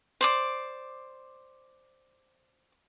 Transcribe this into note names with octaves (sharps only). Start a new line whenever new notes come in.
C5 D5 D6